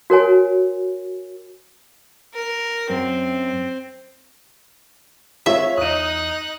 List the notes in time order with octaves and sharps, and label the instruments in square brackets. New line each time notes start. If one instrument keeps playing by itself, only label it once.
[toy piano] F#4 A#4 C#5 G#5
[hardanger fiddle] A#4
[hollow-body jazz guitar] F#2 [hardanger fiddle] C4
[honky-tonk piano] G#3 F4 C#5 [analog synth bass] C4 [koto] E5
[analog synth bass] E2 [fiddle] D#4 F#6 [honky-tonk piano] D#6 D#7